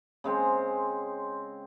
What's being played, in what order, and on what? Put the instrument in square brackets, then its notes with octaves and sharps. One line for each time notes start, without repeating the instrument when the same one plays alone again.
[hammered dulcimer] C#3 G#3 C4 C5